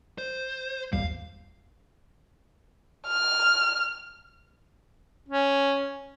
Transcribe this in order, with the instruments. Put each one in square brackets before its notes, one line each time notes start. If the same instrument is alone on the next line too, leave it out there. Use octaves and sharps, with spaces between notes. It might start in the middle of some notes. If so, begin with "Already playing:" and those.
[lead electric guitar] C5
[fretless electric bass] G1 D#2 G3 [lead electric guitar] F5
[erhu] F6
[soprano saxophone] C#4